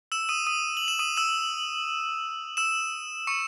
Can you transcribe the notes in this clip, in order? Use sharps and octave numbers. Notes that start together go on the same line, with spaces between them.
E6 E7
D#6 D#7
D#6 D#7
F#7
E7
D#6 D#7
E6 E7
E6 E7
C#6 C#7